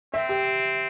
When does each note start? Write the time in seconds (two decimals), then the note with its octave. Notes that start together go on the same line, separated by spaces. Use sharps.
0.14 C4 E5
0.29 G4